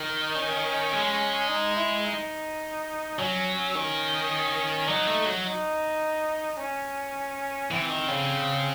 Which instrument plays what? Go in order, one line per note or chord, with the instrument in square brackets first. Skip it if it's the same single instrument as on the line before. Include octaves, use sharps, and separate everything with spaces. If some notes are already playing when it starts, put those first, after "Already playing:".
Already playing: [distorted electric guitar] D#3 [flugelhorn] D#4
[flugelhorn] C#4
[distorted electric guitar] G#3
[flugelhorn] D#4
E4
D#4
[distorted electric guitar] F#3 [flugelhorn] C#4
[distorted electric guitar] D#3 [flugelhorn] C#4
[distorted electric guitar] F#3 [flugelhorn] D#4
[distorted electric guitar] A3
F#3
[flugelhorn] D#4
C#4
[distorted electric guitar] E3 [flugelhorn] C4
[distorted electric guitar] D#3
C#3